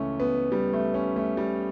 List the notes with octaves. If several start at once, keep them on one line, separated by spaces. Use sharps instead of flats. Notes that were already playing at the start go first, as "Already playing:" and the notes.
Already playing: C#2 C#3 E3 A3 C#4
B3
G3
A3
C#4
A3
G3